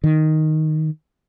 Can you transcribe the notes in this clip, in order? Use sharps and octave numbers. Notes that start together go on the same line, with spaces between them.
D#3